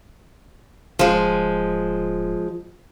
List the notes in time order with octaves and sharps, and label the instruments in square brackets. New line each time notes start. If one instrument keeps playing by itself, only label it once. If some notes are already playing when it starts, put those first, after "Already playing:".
[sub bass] D1 [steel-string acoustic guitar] F3 G#3